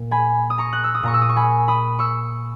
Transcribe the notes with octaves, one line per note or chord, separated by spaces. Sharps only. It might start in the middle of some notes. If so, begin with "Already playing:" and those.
Already playing: A#2
G#5 B5
D#6
A#5 C#6
F#6
E6
D#6
A#2 A#5 C#6
E6
D#6
C#6
G#5 B5
B5 D#6
C#6 E6